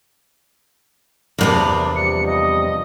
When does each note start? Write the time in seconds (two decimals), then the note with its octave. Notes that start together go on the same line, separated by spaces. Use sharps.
1.39 E2 A2 C3 A#3 B3 D4
1.96 F3 G3 C#7
2.26 D#5